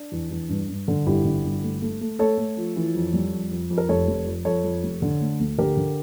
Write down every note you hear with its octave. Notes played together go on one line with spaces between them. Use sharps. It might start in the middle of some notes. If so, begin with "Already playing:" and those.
Already playing: D4
E2
E2
G2
G2
D3
G1 E4 G4
D3
G1
A3
A3
A3
A3 A4 C#5
A3
F3
E3
F2
G3
F2
F2
F2
A#4
F1 A4 C#5
F1
F2
F2 A4 C#5
F2
F1
D3
A3
D2
D3 G4 A#4
D3